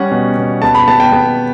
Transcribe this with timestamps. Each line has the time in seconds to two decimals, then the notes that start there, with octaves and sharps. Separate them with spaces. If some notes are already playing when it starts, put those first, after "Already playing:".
Already playing: G3 C#4 F#5
0.12 B2
0.38 B2
0.62 B3 A5
0.75 B5
0.88 B3 A5
1.00 G5
1.12 B3